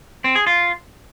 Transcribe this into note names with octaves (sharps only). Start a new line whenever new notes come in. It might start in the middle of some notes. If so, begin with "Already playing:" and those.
C4
G#4
F4